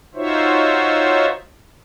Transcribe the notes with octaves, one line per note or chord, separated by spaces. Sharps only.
D#4 F4 F#4 C5 C#5 E5